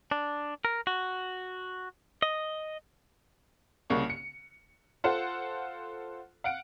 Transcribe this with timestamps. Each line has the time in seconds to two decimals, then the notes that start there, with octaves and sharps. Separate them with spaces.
0.11 D4
0.65 A#4
0.87 F#4
2.22 D#5
3.90 C2 C#3 A#3 C#6
4.10 C#7
5.04 F4 A4 C5 F#5
6.44 F5 F#5 D7